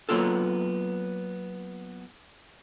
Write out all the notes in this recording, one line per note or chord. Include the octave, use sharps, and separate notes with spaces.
F#3 G3 A#3 B3 F4 A4